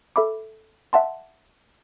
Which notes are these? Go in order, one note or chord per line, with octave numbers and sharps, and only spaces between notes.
A4 E5 B5 D6
E5 F#5 A5 C6